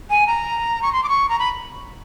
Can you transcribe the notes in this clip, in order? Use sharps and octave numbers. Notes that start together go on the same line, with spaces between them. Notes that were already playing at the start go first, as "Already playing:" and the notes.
G#5
A#5
C#6
C6
D6
C#6
A#5
B5